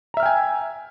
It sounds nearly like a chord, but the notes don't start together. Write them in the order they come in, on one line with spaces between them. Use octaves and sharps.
A#5 E5 F6 G5 G#5